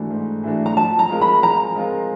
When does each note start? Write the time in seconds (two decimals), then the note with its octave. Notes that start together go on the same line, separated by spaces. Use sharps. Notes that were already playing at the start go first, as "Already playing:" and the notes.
Already playing: G#2 E3 A3 D4 F#4
0.11 G#2
0.44 E3 A3 D4 F#4
0.66 A#5
0.77 F3 A5
0.99 A#5
1.10 G#3 C4 F4 A#4
1.21 B5
1.43 F3 A#5
1.75 G#3 C4 F4 A#4